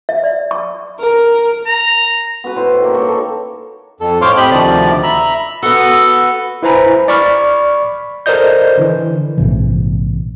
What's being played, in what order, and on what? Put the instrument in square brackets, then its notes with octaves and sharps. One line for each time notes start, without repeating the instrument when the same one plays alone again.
[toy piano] E5
D5
C#6
[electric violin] A#4
[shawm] A#5
[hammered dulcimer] B3 F#4 B4
A2 E4 C5
D#3 A#3
A#3 F#4 A4 C#5
D#4 A4 C#5
[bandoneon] F2 A4
A2 C5 C#5 F5 C6 D6
A2 C4 G4 D#5 B5 G6
D2 C3 D#3 F3 D5
E5 A#5 B5
[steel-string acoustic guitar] B3 F#4 [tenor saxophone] A4
[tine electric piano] E4 B4 C5 G#5 A#5 B5
D5 B5 C#6 F6
A4 A#4 C5 D5 D#5 G6
D3 E3
[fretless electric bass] A#1 G#2 C3 E3